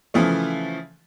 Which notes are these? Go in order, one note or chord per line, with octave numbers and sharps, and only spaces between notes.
C#3 E3 F3 A3